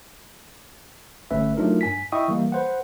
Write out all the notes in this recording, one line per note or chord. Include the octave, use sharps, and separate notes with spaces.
G1 A3 C#4 B4 E5
F#3 A3 D4 D#4 F4 A#4
G2 G#5 B6
E4 D#5 E5 G5 C#6 D#6
E3 G3 A#3
B4 C5 F#5